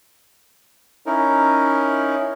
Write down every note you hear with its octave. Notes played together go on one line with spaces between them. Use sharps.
C#4 D#4 E4 A#4